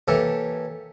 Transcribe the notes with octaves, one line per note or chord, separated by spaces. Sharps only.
E3 A#3 G4 A4 C#5 E5